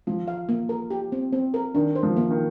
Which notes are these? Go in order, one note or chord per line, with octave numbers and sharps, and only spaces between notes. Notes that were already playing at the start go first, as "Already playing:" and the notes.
F3 F4
F5
A#3
A#4
G4
C4
C4
A#4
D#3 D4
C5
F3
A#3
D#3